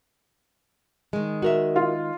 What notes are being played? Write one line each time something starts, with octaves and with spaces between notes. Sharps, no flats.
D#3 G#3
F#4 A#4 E5
F4